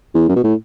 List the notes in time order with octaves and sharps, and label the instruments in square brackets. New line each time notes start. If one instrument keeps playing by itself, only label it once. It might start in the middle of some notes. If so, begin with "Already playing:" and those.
[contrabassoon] E2
F#2
B2
A2